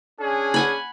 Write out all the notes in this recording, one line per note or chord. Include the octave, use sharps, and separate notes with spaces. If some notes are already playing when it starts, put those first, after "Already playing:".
C#4 D4 G#4
F#5 G#5 B5